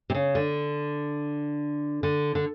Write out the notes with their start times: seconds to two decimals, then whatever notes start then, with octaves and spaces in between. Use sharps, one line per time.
0.10 C3
0.15 C#3
0.35 D3
2.03 D3
2.35 D3